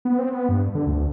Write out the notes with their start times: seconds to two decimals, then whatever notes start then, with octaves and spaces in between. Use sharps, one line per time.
0.05 B3
0.19 C4
0.32 B3
0.49 G2
0.75 D3
0.87 D2